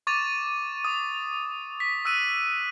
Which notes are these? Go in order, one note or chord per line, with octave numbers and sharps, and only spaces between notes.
C#6 D6 A6 D#7 F7
D#6
B6
D#6 E6 F#6 D#7